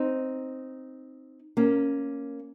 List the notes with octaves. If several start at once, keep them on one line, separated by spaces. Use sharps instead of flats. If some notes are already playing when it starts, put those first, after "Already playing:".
Already playing: C4 D#4
A#3 C#4